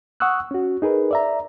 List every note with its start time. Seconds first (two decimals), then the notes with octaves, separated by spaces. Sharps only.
0.20 F#5 C#6 D#6 E6 F#6
0.51 C#4 F#4
0.82 D#4 G#4 A#4 B4
1.11 D5 E5 A#5